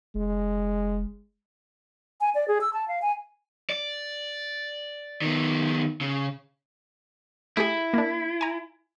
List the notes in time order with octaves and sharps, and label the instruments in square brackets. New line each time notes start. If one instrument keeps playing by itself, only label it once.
[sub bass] F1 [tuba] G#3
[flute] G#5
D5
G#4
E6
A5
F5
G#5
[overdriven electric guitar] D5
D#3 B3
C#3
[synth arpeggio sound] A3 G4 G#4 [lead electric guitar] E4
[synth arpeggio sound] A#3 D4
G#5 A#5